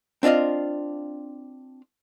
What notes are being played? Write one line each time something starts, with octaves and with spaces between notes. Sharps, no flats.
C4 D4 F4 D#5 F5